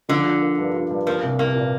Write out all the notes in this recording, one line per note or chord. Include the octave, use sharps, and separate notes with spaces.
D3 F3
F4
A#3
G2
F4
G2
F3 A#3
C2
C2 A#3
A#2